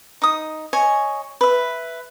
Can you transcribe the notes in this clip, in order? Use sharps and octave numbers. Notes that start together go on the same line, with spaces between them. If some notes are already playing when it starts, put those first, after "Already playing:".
D#4 D#6
C#5 D#5 G#5
B4 E5